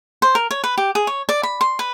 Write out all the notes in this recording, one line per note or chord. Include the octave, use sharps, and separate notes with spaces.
C5
A#4
C#5
B4
G4
G#4
C#5
D5
B5
C6
B4